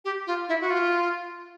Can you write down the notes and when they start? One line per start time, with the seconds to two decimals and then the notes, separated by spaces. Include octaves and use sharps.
0.05 G4
0.27 F4
0.48 E4
0.61 F#4
0.70 F4